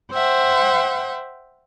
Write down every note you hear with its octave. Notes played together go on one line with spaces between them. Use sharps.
C5 E5 F#5 G5